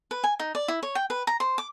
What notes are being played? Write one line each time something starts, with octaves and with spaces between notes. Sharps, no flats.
B4
G#5
D#4
D5
E4
C#5
G5
B4
A#5
C5
D6